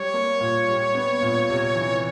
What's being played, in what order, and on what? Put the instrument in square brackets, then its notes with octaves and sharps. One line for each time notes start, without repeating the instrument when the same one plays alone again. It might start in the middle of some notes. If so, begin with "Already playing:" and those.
Already playing: [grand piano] G3 [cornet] C#5
[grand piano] A#3
A#2
G3
B3
A#2
C3
E3